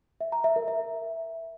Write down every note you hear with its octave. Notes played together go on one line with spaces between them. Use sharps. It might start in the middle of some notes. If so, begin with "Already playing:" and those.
E5
A#5
E5
A#4
E5